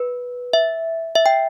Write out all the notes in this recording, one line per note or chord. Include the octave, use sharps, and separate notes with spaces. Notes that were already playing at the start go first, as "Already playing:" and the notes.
Already playing: B4
E5
E5
G5